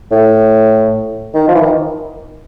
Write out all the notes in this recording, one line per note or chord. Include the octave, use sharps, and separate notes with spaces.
A2
D#3
F3
E3
D#3